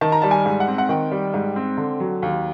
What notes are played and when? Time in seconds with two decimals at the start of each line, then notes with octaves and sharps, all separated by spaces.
0.01 D#3 A5
0.12 A#5
0.22 G3 A5
0.31 G#5
0.46 G#2
0.60 F#5
0.68 C4
0.78 F#5
0.89 D#3 G5
1.12 G3
1.34 G#2
1.56 C4
1.77 D3
2.00 F#3
2.23 D#2